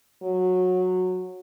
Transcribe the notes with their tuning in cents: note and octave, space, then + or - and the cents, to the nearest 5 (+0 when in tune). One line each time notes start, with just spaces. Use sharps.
F#3 -15